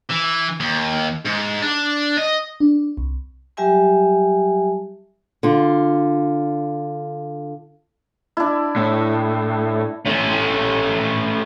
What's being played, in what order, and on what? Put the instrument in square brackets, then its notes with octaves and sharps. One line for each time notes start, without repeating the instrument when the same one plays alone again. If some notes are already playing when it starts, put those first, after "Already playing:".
[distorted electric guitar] E3
D#2
G#2
D4
D#5
[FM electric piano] D4
C2
[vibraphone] F#3 G3 G4 E5 G#5 A5
[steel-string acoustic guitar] D3 F4
[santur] D4 E4
[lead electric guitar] A2
[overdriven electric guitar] A3 C#4